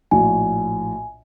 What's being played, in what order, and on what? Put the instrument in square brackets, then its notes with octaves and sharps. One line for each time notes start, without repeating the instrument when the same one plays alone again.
[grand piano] A#1 A2 F#4 [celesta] G#5